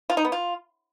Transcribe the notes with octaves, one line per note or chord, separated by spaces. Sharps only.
F4
D#4
B3
F4